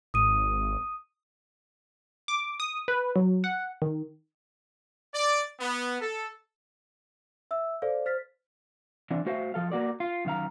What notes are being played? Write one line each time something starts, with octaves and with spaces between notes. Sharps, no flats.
G#1 D#6 D#7
D6
D#6
B4
F#3
F#5
D#3
D5
B3
A4
E5 E6
A4 C5 D5 F5
C5 F6 A6 B6
E3 C4 D4
A3 F#4 C5 E5 F5
F3 A4 F5
A#3 F#4 D5
F4
F#2 D#3 F5 A#5